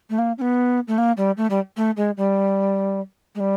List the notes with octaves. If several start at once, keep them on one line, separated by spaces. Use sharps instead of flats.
A3
A#3
C#4
B3
A3
A#3
G3
A3
G3
A3
G#3
G3
G#3
G3